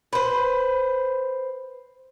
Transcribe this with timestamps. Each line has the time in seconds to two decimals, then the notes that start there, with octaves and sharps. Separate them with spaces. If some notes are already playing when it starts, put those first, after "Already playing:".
0.13 B4 C5